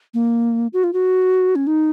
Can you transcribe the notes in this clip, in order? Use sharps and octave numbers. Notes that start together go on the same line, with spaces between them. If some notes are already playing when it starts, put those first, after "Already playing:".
A#3
F#4
F4
F#4
C#4
D#4